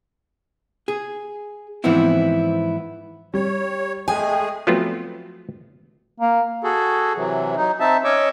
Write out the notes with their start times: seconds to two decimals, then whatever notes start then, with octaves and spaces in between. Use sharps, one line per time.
0.88 G#4
1.84 G#2 E3 F3 B3 C4 E4
3.34 G3 C#5
4.08 G#3 A3 G#4 G5 G#5
4.67 F3 F#3 A3 B3 C4 F4
6.20 A#3
6.64 F#4 G#4 A4
7.16 C3 E3 F#3
7.57 F#3 D#4
7.80 C4 D#4 E5 A5
8.04 C#4 C#5 D#5 C#6 D6 E6